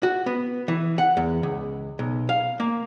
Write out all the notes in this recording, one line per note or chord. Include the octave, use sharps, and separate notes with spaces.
F#4
B3
E3
F#5
E2
C#2
B1
F5
A#3